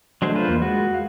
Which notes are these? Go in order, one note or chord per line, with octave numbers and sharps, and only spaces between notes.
F#3 G#3 A3 D4 C5
F4 B4 C5
E2 A#3
G#3 F#4
F5